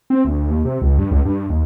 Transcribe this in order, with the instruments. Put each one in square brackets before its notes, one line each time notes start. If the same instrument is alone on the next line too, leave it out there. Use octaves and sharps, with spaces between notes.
[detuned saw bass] C4
D2
D2
D#2
C3
C#2
G2
C#2
G2
D#2